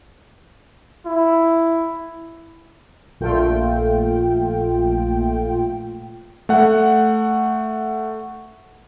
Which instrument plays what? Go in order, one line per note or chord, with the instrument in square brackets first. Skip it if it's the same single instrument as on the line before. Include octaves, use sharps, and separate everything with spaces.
[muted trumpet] E4
[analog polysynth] A#1 A#2 A3 F4 G5
[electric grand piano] A3 F#5